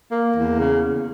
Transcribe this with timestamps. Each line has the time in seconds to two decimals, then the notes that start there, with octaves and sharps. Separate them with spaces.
0.10 A#3
0.34 E2
0.57 C#3